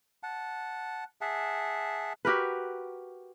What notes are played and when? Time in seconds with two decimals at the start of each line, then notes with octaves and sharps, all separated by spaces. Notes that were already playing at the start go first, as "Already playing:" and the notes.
0.23 F#5 A5
1.21 G#4 E5 F#5 A5
2.25 F#4 G4 A#4 B4